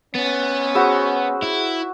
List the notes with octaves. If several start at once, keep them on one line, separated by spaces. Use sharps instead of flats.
B3 C#4 A6
F#4 G#4 C5 B5 E6
E4